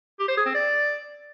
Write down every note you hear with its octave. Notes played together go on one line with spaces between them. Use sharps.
G4
C5
G#4
C4
D5